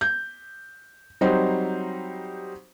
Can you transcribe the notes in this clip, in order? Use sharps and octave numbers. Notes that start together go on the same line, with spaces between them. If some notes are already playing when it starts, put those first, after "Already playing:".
G6
F#3 G3 C4 D#4 C5